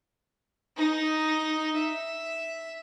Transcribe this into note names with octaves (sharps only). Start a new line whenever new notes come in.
D#4
E5